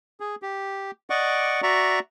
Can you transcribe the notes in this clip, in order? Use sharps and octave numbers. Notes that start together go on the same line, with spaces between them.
G#4
G4
D5 D#5 F#5 C#6 D6
F#4 D5 E5 A#5 C#6